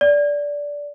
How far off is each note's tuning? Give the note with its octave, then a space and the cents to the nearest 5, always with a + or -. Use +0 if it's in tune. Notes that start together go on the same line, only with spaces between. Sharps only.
D5 -15